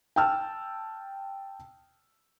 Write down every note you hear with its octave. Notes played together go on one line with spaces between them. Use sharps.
G5 A5 E6 F6